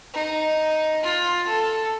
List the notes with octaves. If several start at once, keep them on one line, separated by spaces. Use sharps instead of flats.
D#4
F4
A4